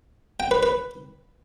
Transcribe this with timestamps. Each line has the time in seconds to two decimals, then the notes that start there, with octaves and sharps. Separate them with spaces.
0.40 G5
0.51 B4
0.63 B4